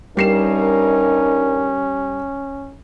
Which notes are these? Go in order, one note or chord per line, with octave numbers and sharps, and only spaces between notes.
G2 G3 C#4 D#4 A#4 C7 E7